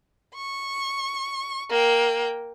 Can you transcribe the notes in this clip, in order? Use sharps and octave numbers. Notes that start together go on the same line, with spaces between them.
C#6
A#3 G5